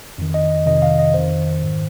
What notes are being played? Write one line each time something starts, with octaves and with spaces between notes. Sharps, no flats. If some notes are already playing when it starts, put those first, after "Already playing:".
F2 D#3
D#5
F2 C3 D#3 D#5
F5
D#5
F2 D#3 C5
G#2 D#3